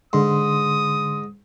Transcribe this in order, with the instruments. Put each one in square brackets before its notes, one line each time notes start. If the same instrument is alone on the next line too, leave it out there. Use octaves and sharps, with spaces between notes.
[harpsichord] G#2 [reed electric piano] D3 C6 [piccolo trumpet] D#6